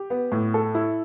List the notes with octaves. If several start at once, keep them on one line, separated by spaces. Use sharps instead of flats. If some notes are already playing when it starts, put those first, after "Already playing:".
Already playing: G4
B3
A2
A4
E4